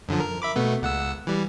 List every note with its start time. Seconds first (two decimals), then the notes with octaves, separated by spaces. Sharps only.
0.08 F#2 D3 F3
0.20 A#4
0.42 E5 B5 D6
0.56 B2 A3 B3
0.82 C#2 F#5 E6
1.27 E3 G3